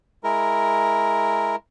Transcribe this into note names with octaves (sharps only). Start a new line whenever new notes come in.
G#3 E4 A#4